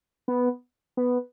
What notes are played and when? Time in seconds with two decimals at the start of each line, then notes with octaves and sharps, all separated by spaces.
0.28 B3
0.97 B3